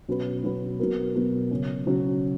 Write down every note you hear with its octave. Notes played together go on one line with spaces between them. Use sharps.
B2 F#3 C#4 F#4 B4
B2 F#3 C#4 F#4 B4
B2 F#3 B3 F#4 A#4
B2 F#3 B3 F#4 A#4
C#3 F#3 C#4
C#3 F#3 C#4